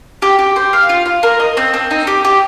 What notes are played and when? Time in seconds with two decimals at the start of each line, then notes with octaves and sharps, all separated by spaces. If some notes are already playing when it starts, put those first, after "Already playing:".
0.22 G4
0.39 G4
0.56 C5
0.73 F5
0.89 F4
1.06 F4
1.23 A#4
1.40 D#5
1.57 C4
1.74 C4
1.91 D#4
2.07 G4
2.25 G4